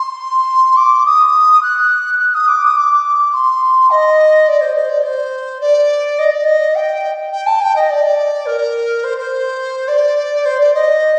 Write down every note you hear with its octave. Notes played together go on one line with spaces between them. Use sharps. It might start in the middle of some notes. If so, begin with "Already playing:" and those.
Already playing: C6
D6
D#6
F#6
F#6
D#6
D6
D#6
D6
C6
D#5
D5
C5
C5
D5
C5
D5
D#5
D5
D#5
G5
G5
A5
G5
D#5
D5
A#4
C5
C5
D5
C5
D5
D#5